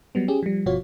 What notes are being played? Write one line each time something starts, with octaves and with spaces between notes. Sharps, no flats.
F#3 G3 B3
C#4 G4 G#4
F3 G3
G1 B2 F3 F4 F#4 C#5